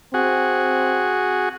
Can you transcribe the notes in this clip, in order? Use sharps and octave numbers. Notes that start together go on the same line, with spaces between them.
C4 F#4 G#4